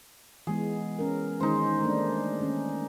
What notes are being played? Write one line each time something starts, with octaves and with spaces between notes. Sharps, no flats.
E3 G#3 B3 G#4
C#4 A#4
D#3 G#3 C#4 D#4 C5
A3 A#3 D4
D#3 C#4